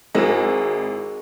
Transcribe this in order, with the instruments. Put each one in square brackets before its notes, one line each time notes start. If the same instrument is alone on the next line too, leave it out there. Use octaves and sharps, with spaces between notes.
[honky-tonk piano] G#1 E4 E7 [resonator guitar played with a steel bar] G#3 [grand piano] D#4 F#4 A#4